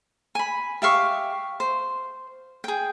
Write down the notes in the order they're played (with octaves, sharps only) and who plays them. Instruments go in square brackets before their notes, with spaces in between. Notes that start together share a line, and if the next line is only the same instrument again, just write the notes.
[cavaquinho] G#5 B5
G4 E5 F5 C#6
C5
G#4 G5